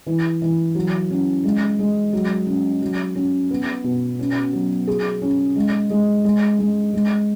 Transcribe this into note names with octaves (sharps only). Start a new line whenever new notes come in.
E3
E3
F#3
C#4
G#3
G#3
F#3
C#4
F#3
C#4
B3
B2
C#4
F#3
G#4
C#4
G#3
G#3
G#3
G#3
G#3